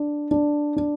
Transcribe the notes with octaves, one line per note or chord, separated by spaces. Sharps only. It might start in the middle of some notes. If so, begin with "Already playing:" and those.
Already playing: D4
D4
D4